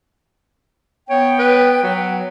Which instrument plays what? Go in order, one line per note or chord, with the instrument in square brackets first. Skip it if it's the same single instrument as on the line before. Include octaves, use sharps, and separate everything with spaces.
[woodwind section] B3 G5 [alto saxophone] C#5
[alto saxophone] B4
F#3